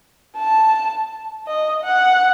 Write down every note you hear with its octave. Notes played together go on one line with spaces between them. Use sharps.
A5
D#5
F#5